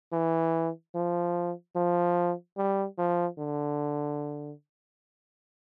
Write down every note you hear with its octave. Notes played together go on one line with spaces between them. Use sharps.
E3
F3
F3
G3
F3
D3